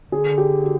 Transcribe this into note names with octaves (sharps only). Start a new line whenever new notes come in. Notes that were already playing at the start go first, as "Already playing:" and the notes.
D3 G#4
G4
F#4